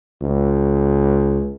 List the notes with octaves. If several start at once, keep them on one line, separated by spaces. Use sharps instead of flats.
C#2